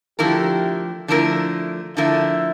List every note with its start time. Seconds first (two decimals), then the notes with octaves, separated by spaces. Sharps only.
0.19 D3 F3 A3 E4 G4 A#4
1.08 D3 F3 A3 E4 A#4
1.97 D3 F3 A3 E4 A#4 E5